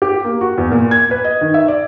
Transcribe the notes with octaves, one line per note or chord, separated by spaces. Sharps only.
G4
A#3
F#4
E2
A#2
G#6
B4
D#5
D#3
E5
D5